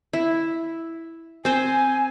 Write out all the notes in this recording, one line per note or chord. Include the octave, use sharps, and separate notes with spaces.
E4
C4 C5 G#5